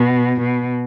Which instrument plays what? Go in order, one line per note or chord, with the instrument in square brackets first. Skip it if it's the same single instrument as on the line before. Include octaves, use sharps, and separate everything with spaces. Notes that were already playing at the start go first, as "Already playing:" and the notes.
Already playing: [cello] B2
B2